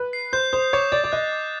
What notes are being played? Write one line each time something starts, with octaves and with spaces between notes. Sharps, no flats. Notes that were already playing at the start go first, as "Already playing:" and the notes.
Already playing: B4
C7
C5 G6
C5 D#6
C#5 D6
D5 A6
D5
D#5 F#6
D6